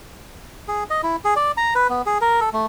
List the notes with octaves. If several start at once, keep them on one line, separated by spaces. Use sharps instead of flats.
G#4
D#5
E4
G#4
D5
A#5
B4
B3
G#4
A#4
A4
A3